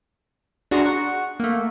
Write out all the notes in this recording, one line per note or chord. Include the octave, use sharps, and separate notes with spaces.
D4 F#4 G#4 A#5 C6
F#5 C#6
A3 A#3